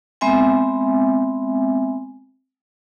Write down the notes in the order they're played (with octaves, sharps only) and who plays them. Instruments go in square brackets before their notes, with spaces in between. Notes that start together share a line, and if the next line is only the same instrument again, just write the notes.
[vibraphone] G#3 B3 C4 E5 G#5